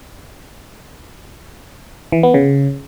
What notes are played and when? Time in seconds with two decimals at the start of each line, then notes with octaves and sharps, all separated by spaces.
2.12 E3
2.23 B3
2.34 C#3